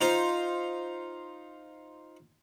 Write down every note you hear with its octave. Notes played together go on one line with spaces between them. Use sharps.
D#4 F4 C5